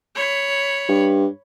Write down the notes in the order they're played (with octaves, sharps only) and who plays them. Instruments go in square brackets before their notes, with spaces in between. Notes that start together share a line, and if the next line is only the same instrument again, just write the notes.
[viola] C#5 B5
[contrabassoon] G2